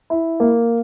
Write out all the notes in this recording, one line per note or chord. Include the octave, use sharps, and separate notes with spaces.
E4
A#3